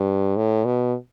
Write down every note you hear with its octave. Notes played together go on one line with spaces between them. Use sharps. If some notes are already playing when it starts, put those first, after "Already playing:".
Already playing: G2
A2
B2